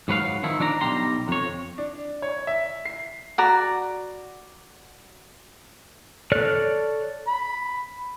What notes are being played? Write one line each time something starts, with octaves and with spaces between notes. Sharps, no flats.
G#2 F#3 B4 F5
D#3 F3 E4
F3 D4 D5 A#5
B1 G3 G4 A#5 C6
F2 C#5
D4
C#5
E5
C7
F#4 D5 A#5 B5
A4 C#5 D5 F6 F#6
B5